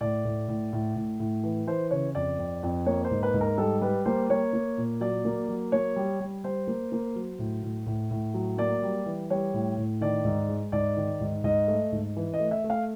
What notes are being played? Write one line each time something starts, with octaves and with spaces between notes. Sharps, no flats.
A2 D5
A2
A2
A2
A2
A2
E3
E3 C5
C#3 C#5
F2 D5
F2
F2
A#3 C#5
C5
G#2
B4
G#2
A#4
G3 A4
G3 B4
A#3 C5
A#3 C#5
A#3
A#2
F#3 D5
A#3
F#3
A#3 C#5
G3
G3
G3 C5
A#3
A#3
F#3
A2
A2
A2
A2
F#3
A#3 D5
G3
E3
G3 C#5
A2
A2
D#3 D5
G#2
G#3
G#2 D5
D#3
G#2
G#2 D#5
A3
G#2
E3
D#5
A3
E5
A3
F5